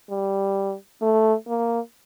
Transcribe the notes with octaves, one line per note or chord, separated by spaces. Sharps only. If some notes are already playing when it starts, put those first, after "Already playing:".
G3
A3
A#3